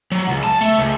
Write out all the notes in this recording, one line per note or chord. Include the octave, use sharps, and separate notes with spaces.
F#3
C#2
A5
A3
C#2